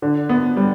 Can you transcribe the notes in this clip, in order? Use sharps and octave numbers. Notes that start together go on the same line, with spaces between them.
D3
B3
G3